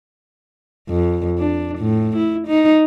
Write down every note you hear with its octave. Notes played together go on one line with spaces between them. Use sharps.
F2
D4
A2
E4
D#4